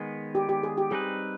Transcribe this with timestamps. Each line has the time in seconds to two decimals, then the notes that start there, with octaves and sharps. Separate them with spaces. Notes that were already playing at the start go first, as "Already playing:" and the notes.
Already playing: D#3 G#3 B3
0.35 G4
0.49 G4
0.63 G#4
0.78 G4
0.91 G3 C4 D#4 G#4 B4